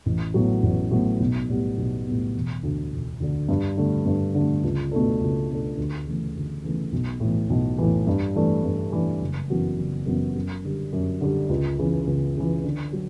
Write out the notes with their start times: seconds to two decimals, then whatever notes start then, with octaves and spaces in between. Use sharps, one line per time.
0.06 A1
0.34 A2 F#3 B3
0.63 A1
0.91 A2 F#3 B3
1.20 B1
1.48 A2 G3 B3
1.77 B1
2.06 A2 G3 B3
2.35 E1
2.63 D2 D3
2.92 E1
3.20 D2 D3
3.49 G2
3.78 D3 A3
4.06 G2
4.35 D3 A3
4.63 C#2
4.92 B2 A3 D4 A4
5.21 C#2
5.49 B2 A3 D4 A4
5.77 D2
6.06 C#3 E3 A3
6.35 D2
6.64 C#3 E3 A3
6.92 B1
7.20 A2 E3
7.50 B1
7.78 A2 E3
8.07 G2
8.35 E3 A3 D4
8.64 G2
8.92 E3 A3 D4
9.21 F#1
9.50 F#2 E3 B3 F#4
9.78 F#1
10.06 F#2 E3 B3 F#4
10.36 F#2
10.64 D3 G3
10.93 F#2
11.21 D3 G3
11.49 C#2
11.79 C#3 E3
12.07 C#2
12.36 C#3 E3
12.64 D3
12.93 F#3